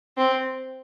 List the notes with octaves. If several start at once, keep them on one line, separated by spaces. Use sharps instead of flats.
C4